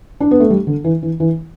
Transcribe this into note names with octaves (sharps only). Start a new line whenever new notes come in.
D4
B3
A3
G3
D3
E3
E3
E3